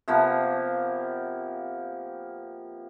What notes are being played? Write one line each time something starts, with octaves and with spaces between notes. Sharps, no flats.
C3 F3 A#3 B3